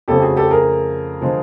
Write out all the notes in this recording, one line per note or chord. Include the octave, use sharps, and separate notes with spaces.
F2 C#3 F3 A3 G4 A4
F#4 G#4
G4 A4
G#4 A#4
D3 F3 G#3